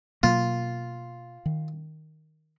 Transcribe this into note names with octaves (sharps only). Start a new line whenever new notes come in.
B2 F#3 A#3 F4
D#3